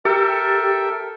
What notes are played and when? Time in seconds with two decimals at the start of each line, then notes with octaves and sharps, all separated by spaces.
0.05 G4 A4 A#4 E5 G5